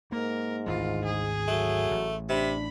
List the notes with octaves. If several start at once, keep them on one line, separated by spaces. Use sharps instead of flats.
G#2 A#3 A#4
G#1 D2 E3 F4
G#4
F#3 A3
A1
C3 D4 B5